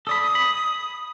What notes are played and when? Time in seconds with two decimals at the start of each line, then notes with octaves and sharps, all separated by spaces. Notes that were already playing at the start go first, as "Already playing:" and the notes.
0.07 A4 D5 B5 D#6
0.35 B5